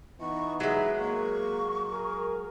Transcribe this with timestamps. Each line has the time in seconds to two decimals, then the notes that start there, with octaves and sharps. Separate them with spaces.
0.21 E3 B3 D#4 C#6
0.60 F#3 G#3 E5
1.00 A#3 C#6
1.93 G#4 A#4